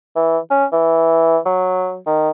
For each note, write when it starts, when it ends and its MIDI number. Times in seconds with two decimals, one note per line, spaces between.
0.16 0.38 52
0.51 0.65 61
0.73 1.38 52
1.45 1.97 54
2.07 2.31 51